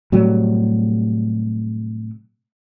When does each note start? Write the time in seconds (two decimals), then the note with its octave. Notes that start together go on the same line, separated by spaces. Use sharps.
0.12 A2 C3 F#3 G3